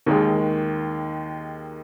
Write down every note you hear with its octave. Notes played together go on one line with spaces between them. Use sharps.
D#2 D#3 G#3